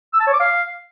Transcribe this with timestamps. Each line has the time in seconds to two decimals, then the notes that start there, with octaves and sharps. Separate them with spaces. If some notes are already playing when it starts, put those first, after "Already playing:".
0.14 E6
0.20 A5
0.27 C#5
0.33 D6
0.40 F5